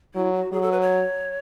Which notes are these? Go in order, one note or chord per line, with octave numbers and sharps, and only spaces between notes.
F#3 E4
F#4
F#3 G#4
A4
B4
C#5